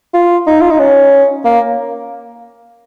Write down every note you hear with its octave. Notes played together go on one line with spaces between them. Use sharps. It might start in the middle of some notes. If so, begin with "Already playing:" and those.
F4
D#4
F4
D#4
C#4
A#3